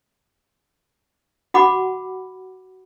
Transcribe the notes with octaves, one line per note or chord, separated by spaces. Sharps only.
F#4 F#5 B5 D6